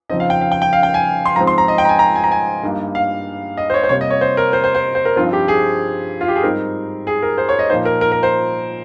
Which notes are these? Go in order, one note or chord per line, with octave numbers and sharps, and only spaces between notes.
F2 C#3 F3 C4 D#4 D#5
F5
G5
F5
G5
G5
F5
G5
G#5
C6
G#2 F3 G#3 C4 A#5
C6
A#5
D#5
G5
A#5
G#5
A#5
G#5
A#5
G#5
G2 G3 A#3 D#4
F5
D#5
C5
C#5
C5
C3 G3 A#3 C#5
D#5
C#5
C5
A#4
C5
C5
C5
C5
A#4
G2 F3 C4 D#4 F4
G4
G#4
F4
G4
G#4
G#2 G3 C4 D#4 A#4
G#4
A#4
C5
C#5
D#5
A#2 F3 A#3 D#4 C5
A#4
A#4
A#4
C5